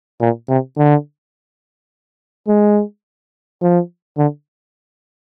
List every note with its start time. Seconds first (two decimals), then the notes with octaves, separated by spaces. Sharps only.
0.21 A#2
0.49 C3
0.77 D3
2.48 G#3
3.61 F3
4.18 D3